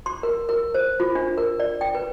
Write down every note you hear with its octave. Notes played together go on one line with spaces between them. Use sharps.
C6
A#4
A#4
C5
F4
D4
A#4
D5
G5
B4